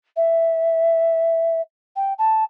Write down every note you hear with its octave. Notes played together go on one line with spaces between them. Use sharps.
E5
G5
A5